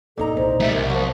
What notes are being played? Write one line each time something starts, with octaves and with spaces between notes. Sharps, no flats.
E2 G2 A#2 D#4 A4 A#5
C2 C5
B1 G3 A3 E5
C2 A#4
F3 F#3